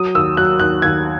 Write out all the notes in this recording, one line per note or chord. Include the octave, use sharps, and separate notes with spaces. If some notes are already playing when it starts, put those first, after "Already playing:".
Already playing: F#3 D#6
D#2 E6
F#3 F#6
D#2 F#6
D#2 G#6